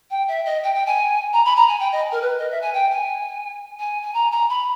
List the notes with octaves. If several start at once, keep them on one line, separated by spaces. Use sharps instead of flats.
G5
E5
D#5
G5
G5
G#5
A#5
B5
A#5
G#5
G5
D#5
A#4
B4
D#5
E5
G#5
G5
G#5
G#5
G#5
A#5
A#5
B5